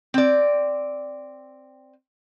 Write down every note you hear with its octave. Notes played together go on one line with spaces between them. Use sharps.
C4 D5